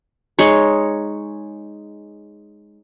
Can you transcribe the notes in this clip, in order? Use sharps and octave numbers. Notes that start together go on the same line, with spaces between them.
G#3 D#4 C#5